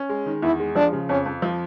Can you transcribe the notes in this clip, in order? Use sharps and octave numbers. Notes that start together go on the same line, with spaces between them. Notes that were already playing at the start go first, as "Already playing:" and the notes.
Already playing: C#4
G#3
D#3
E2 E4
G#3
F3 D4
C#3
F2 C#4
F2
F3